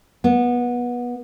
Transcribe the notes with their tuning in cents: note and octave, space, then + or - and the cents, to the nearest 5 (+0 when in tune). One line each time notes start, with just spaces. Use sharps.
B3 -20